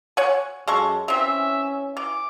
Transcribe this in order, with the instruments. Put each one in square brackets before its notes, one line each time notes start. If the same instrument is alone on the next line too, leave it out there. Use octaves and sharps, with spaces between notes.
[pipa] C#5 F#5 G#5
[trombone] F#2 [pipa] G#3 A4 C#6
[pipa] E3 C4 [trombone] C#4 [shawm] E5
[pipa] E3 [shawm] D6